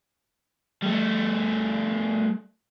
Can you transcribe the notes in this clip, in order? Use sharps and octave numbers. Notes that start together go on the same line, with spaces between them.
G3 A3